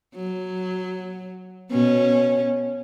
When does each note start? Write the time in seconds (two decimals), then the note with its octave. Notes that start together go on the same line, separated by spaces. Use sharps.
0.15 F#3
1.70 B2 C#4